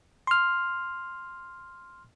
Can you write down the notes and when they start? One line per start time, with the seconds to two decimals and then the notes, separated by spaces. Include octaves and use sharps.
0.27 C6 F6